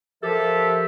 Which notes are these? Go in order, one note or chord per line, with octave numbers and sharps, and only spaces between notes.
F3 G4 A4 A#4 E5